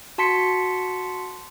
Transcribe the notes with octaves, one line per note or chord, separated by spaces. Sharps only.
F#4 A5 C6 B6 C#7